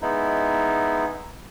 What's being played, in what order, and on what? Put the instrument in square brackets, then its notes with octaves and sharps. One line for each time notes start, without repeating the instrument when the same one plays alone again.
[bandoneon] G#3 B3 D#4 E4